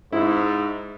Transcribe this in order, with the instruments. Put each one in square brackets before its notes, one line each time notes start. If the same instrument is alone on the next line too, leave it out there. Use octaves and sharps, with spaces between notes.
[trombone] G#2 [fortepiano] E4